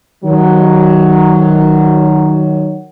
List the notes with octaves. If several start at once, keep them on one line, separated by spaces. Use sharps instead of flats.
D#3 F#3